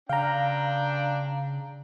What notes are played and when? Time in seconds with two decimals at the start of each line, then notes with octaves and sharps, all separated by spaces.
0.09 C#3 D4 F5 G5 A#5